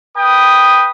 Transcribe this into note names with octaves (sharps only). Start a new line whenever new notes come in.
B4 G5 D#6